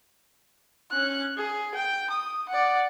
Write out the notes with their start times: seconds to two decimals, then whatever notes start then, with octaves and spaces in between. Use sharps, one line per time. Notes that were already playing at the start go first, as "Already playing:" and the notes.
0.91 C#4 F#6
1.37 G#4
1.74 G5
2.10 D#6
2.49 D5 F#5